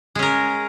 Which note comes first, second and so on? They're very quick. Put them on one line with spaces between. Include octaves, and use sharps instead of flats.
G#3 C#4 A#4